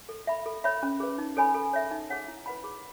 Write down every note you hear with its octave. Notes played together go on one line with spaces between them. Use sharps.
A4
E5 B5
A4
C#5 E5 B5
C#4
G#4 B4
D#4
A4 C#5 G#5 B5
A4
C#5 E5
D#4
G#4 C#5 F#5
E4
B4 F#5 B5
G#4